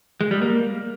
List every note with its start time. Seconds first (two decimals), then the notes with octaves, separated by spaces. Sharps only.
0.21 G#3
0.31 G3
0.42 A#3